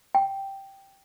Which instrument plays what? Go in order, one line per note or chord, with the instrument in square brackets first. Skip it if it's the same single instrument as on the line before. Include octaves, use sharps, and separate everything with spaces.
[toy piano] G5